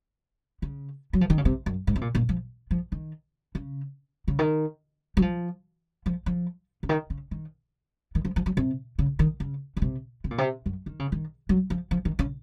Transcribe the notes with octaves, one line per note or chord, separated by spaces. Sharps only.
C#3
F#3
F3
D#3
C#3
C3
F#2
G#2
C3
A#2
A#2
F3
F3
D#3
C#3
C#3
D#3
F#3
F3
F3
F3
C#3
D#3
C#3
D#3
D#3
F3
F3
F#3
C3
C#3
D#3
C#3
C#3
C3
C3
A#2
C3
F#2
D#3
C#3
D#3
F#3
F3
F3
D#3
C#3